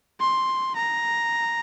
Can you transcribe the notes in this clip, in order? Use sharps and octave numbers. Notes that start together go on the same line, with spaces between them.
C6
A#5